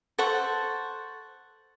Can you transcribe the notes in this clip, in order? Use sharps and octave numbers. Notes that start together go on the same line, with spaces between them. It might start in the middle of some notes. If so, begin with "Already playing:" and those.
A4 C5 F#5 C#6